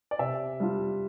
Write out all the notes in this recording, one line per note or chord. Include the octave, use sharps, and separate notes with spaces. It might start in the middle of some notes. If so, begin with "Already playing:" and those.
D5
C3 E5
G3 D4 F4